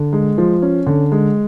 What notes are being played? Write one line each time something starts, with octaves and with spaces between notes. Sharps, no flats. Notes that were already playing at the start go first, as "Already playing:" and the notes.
Already playing: D3
G#3
F3
C#4
D3
G#3